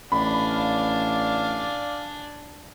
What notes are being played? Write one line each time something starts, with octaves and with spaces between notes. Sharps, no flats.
A1 D4 D5 F5 G#5 B5